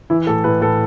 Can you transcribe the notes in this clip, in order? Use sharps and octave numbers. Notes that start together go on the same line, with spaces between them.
E3 E4
A2 A4
A2 B4
A2 A4